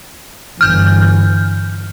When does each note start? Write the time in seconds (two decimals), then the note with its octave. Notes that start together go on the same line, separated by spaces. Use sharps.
0.61 G1 E3 F6 G6